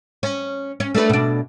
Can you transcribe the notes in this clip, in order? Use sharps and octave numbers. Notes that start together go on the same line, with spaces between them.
C#4
C#4
A3 D4 B4
B2 D4